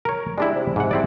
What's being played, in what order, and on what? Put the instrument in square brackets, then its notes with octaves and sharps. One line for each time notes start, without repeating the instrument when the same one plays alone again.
[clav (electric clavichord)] A#4 C#5
[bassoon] G3 [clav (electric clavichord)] G#3 D4 E4
[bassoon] C3
[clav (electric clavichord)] G#2 F#5
C4 E4 D5